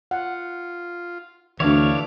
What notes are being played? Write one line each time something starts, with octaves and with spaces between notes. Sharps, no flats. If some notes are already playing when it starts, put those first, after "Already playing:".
F4 F#5
D2 D3 E3 D4 E4 C#5 D5 F5